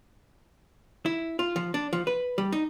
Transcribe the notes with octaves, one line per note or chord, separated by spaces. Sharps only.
E4
F4
F3
D4
F3
B4
G3
D#4